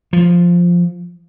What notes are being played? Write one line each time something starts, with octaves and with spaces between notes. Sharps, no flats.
F3